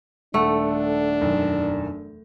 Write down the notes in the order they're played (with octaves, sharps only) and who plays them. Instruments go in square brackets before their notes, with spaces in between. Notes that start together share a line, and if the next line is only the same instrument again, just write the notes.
[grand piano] D#1 A4 F#5 [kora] A3 [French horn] D4
[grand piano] E1 F#2 D#3